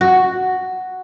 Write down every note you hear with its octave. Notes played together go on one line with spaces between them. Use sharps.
F#4